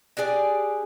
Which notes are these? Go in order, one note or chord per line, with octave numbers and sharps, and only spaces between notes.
D4 G4 G#4 D5